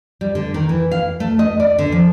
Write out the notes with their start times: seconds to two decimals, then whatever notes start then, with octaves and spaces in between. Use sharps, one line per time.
0.21 G3
0.35 D3
0.54 D#3
0.69 E3
0.91 F5
1.20 A3
1.39 D#5
1.60 D5
1.79 D3
1.92 F3